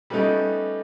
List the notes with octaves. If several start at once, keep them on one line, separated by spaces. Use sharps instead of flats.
G3 A3 B3 C#4 D#4 G4